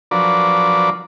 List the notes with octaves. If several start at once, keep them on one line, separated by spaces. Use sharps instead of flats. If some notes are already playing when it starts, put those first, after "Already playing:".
F3 F#3 D4 A#4 B4 D5